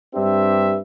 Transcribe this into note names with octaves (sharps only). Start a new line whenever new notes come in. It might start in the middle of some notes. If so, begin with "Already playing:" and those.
G2 C4 D4 G4 B4 E5